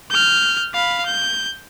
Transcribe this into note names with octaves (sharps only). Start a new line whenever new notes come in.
F6 G6
F5 B5
G6